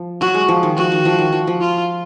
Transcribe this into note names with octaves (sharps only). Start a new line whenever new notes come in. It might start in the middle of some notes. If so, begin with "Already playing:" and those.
Already playing: F3
F#3 F#4
G#3
F3
D#3
F3 F#4
D#3
F3
D#3
F3
F3
F4